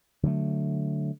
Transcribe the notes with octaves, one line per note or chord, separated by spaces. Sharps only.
D3 F#3 G3 A3